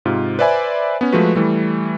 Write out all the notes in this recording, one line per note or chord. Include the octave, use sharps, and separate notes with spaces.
G#2 C3 F4
B4 C5 D5 E5 G#5 B5
B3 C#4
F3 G#3 A3 F#4 B4
E3 G3 A3